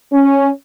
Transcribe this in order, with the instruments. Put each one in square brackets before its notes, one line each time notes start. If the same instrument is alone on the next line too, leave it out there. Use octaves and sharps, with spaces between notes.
[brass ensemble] C#4